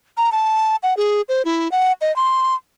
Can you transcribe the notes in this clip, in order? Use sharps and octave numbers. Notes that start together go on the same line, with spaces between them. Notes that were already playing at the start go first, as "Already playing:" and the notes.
A#5
A5
F#5
G#4
C5
E4
F#5
D#5
C6